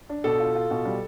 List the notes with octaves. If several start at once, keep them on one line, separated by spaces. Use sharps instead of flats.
D4
B2 A4
F4
F4
B2
G3